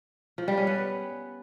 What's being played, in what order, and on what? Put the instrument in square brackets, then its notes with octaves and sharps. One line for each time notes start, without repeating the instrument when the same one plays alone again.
[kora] F3
G3
C#4
B3